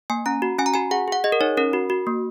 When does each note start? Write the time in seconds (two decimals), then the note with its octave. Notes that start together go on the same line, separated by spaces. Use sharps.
0.10 A#3 G#5
0.26 C#4 A#5
0.42 F#4
0.58 C#4 G#5
0.66 A#5
0.74 F#4 G#5
0.91 G#4 F#5
1.08 G#4 F#5
1.24 G#4 D#5
1.32 A#4
1.41 D#4 C#5
1.57 C#4 A#4
1.73 F#4
1.90 F#4
2.07 A#3